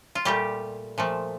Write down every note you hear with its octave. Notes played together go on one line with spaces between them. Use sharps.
F4
A#2 G3 A3 G4
A#2 F3 A3